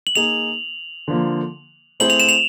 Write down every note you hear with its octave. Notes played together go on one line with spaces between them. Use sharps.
F#7
A#3 D#4 G#4 F7
D3 F3 A#3
A3 C4 E4 G#4 C5 F#7
F7
E7
F7